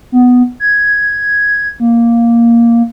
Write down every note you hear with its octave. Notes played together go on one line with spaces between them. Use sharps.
B3
G#6
A#3